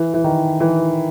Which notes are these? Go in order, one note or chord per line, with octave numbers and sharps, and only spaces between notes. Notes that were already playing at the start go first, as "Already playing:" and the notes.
Already playing: E3
E3
D#3
E3